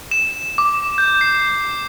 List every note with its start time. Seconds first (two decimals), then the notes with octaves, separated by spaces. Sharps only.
0.11 E7
0.58 D6
0.98 G6
1.21 C7